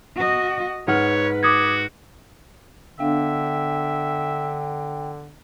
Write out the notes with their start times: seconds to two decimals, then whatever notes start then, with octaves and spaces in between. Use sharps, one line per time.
0.16 F#4 D#5
0.88 G#2 B4 C#5 F#5 F6
1.43 F#4 D6 D#6 G#6
2.99 D3 B3 D4 E5 F5 G5